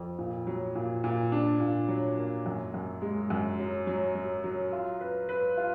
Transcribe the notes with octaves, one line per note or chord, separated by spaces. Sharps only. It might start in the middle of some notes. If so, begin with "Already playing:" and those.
Already playing: F2
A#2
F#3
A#2
A#2
D4
A#2
F#3
A#3
F#2
F#2
G#3
F#2
F#3
F#3
F#3
F#3
F4
B4
B4
F4